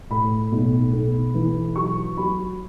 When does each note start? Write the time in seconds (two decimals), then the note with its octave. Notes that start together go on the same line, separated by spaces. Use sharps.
0.10 A2 B5
0.52 B1
0.93 B1
1.34 E3
1.76 F#3 C#6
2.17 F#3 B5